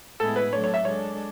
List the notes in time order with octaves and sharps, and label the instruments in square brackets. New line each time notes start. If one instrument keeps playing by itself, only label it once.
[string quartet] A2 G#3 B3 E4 G#4 [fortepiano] A4
[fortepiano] B4
[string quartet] F#3 A3 D4 A4 [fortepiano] C#5
[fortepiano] C#5
E5
[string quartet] G#3 D4 A4 [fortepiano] C#5